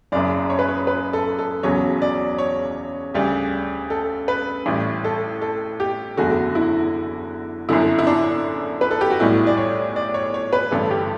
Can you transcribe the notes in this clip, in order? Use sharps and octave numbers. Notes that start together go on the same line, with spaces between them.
F#1 F#2 C#3 D5
C#5
B4
C#5
B4
A4
A4
E1 E2 C#3 F#3 C#5
D5
C#5
D2 C#3 G3
A4
B4
A1 A2 G3
A4
A4
G4
F#1 E2 D3 A3 F#4
E4
G1 F#2 D3 E4
E4
D4
B4
A4
G4
F#4
B1 A2 G3 E4
D5
C#5
D5
C#5
C#5
B4
A1 G2 D3 A3 A4
G4